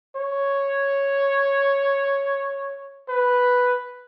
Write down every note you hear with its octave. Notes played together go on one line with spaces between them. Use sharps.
C#5
B4